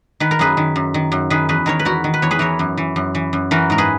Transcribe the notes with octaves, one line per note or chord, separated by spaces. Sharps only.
D#3 B4
A#4
F#2 G#4 B4
D#3
F#2
D#3
F#2
D#3 G#4 B4
E2 G#4 B4
D#3 A#4 C#5
B4
E2 F#4 A#4
D#3
B4
E2 C#5
G#4 B4
E3 A#4 C#5
F#2
E3
F#2
E3
F#2
E3 F#4 A#4
G#2 A#4
G#4 B4